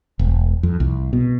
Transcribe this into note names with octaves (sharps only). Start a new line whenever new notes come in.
E1
F2
C2
B2